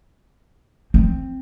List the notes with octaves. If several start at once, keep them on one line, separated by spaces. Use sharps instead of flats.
C4